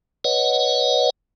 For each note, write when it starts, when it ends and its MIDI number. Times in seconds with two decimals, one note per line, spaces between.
0.24 1.10 71
0.24 1.10 73
0.24 1.10 75
0.24 1.10 78